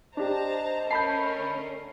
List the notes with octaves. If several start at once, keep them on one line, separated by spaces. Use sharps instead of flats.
D4 G4 C5 D#5 A5 A#5
A3 C#4 A#4 A5 B5 G6 C7
D3